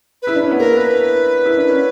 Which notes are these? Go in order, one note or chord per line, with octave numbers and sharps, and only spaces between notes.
E4 B4
D4
C#4
B3
A#3 A#4
B4
E4
D4
C#4